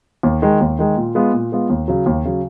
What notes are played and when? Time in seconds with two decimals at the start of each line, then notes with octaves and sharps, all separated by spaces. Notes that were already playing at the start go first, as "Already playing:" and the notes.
0.23 D#2
0.42 D#3 G#3
0.61 D#2
0.79 D#3 G#3
0.97 A#2
1.15 G#3 B3 F4
1.33 A#2
1.52 G#3 B3 F4
1.70 D#2
1.88 C#3 F#3
2.06 D#2
2.25 C#3 F#3